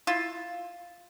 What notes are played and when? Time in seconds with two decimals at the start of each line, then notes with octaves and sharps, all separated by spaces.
0.07 E4 F4